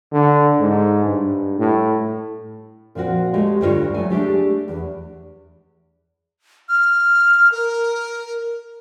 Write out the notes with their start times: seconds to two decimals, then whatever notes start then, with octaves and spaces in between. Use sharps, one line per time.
0.12 D3
0.59 G#2
1.05 G2
1.59 A2
2.95 A#2 F3 C4 F#4
3.33 G#3 A3 G4
3.61 D2 G2 F4 C#5
3.94 F#3 A3 G#5
4.10 A3 D4 G4 G#4
4.68 E2
6.69 F6
7.52 A#4